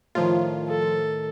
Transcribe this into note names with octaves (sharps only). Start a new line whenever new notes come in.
A2 D#3 F3 F4
A4